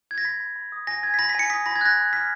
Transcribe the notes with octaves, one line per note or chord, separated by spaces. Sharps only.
G#6
A#6
B5 B6
B5
B5
D#6
G#5 A#6
G#5 G#6
B6
B5 A#6
B6
G#5 C#7
D#6 B6
B5 A#6
G#6
F#6 A#6
B5
F6 B6